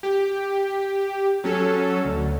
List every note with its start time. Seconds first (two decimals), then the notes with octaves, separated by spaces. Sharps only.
0.03 G4
1.44 F#3 C#4 A4
2.05 D2